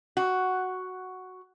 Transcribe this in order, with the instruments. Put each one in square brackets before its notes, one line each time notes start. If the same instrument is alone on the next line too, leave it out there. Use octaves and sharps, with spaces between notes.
[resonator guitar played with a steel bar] F#4